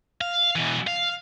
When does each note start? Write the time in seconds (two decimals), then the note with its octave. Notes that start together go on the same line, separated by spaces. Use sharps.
0.21 F5
0.56 B2 E3
0.87 F5